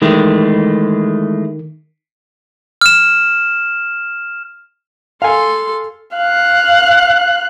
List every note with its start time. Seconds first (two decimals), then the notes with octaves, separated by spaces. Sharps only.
0.02 D#3 E3 G#3 A3
2.81 F6 E7
5.22 A4 F5 G#5 C6
6.17 F5 F#6